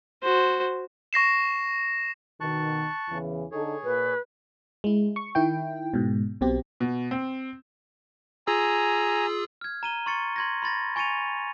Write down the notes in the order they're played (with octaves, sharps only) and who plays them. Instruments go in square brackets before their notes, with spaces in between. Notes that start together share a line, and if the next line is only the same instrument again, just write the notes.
[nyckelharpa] F#4 C5
[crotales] C#6 A#6 C7 E7
[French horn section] B2 D#3 [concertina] A5 C#6 F#6
[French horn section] E2 C#3 E3
[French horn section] D3 D#4 A4 [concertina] G#4 C#5
[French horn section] A#2 [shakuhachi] B4
[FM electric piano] G#3 E4
C#6
D#3 E4 G5
G#2 B2
B1 B2 C4 G4
[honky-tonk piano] B2
C4
[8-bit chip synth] F4 G#4 E6 [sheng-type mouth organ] G#5 A#5
[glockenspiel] F6 G#6
A#5 D#7 G7
C6 C#6 A6 C#7
C6 G#6 A#6
B5 C6 A6 A#6
G#5 C#6 A6 C#7 D#7 F7